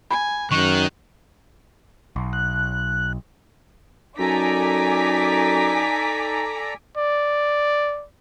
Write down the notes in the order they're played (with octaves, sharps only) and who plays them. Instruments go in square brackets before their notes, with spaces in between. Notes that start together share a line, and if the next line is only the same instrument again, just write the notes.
[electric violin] G#5 [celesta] B5
[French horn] F#2 [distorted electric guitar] D#3 [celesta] C#6 [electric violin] F#6
[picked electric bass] B1
[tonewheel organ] F#6
[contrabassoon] F#2 [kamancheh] D#4 [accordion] A4 D5 A#5 [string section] G#5 D6 B6
[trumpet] D5